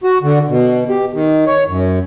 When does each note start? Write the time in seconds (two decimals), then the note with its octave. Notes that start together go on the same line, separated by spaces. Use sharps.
0.04 F#4
0.23 D3
0.48 B2
0.89 G4
1.13 D#3
1.47 C#5
1.68 F#2